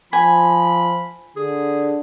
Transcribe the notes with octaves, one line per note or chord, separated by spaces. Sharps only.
F3 G#5 B5
D3 G#4